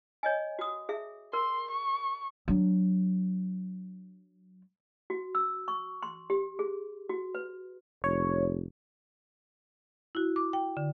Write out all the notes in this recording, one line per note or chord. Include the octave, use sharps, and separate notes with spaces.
C#5 D#5 G#5
F#4 D#6
G#4 E5
A#4 C6
C#6
F#3 D4
F#4
E6
C#6
C6
G4
G#4
F#4
B4
F1 C#5
E4 F#4
D6
G5
D3